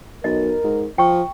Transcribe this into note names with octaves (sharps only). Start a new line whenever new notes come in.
B1 A#4 D#5
G#2
F3 G5 C#6